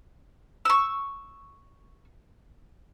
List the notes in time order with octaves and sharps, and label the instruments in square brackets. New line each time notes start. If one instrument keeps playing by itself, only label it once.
[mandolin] C#6 E6